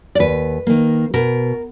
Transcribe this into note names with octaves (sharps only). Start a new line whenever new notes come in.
D5
D#2 B4
D#3 A#3
B2 A#4